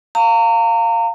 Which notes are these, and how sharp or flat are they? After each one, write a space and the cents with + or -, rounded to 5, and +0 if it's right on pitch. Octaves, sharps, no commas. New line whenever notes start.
F5 +0 A#5 -35